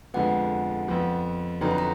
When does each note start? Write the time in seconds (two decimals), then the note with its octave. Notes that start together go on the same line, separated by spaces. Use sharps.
0.14 F2 D3 F3 G#3 B3 F#5
0.88 F2 F3 B3
1.61 F2 D3 F#3 B3 D#4 A#5
1.71 B5
1.78 A#5